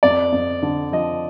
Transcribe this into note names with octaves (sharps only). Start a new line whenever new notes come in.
F2 D5
F2
D3
F3 D#5